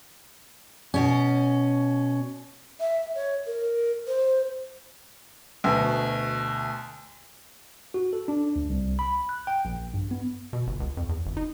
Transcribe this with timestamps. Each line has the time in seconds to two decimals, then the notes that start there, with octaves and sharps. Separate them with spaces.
0.94 B2 C#4
2.80 E5
3.15 C#5
3.47 A#4
4.07 C5
5.64 D2 B2
7.94 F#4
8.13 A4
8.28 D4
8.56 D2
8.69 C2
8.99 B5
9.29 F#6
9.47 G5
9.65 A#1
9.94 G2
10.11 B3
10.53 B2
10.67 G1
10.80 C#2
10.97 F2
11.09 E2
11.26 G1
11.37 D#4